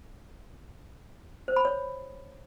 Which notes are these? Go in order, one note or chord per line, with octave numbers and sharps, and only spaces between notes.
C5
B5
C#5